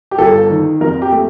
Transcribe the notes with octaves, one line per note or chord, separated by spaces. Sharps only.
G4
G1 A4
D#3
F2 A#4
G4
A3